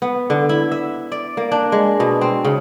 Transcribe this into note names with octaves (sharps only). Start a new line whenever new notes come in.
B3
D3
E4
E5
D5
A#3
D4
G#3
B2
C4
C#3